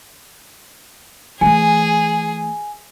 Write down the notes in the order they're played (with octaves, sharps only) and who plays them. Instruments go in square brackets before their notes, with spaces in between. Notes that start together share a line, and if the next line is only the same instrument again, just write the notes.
[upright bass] E3 A3 [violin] G#4 [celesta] G#5